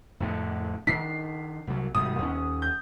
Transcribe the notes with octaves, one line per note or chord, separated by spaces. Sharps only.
F2 A2 D3
D#3 D4 B6 C7
C2 F#3
G#1 C3 G3 D#6
D#2 A#3 C#4
G6